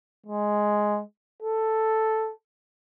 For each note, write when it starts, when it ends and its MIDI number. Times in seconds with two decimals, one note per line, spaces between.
0.27 1.02 56
1.43 2.32 69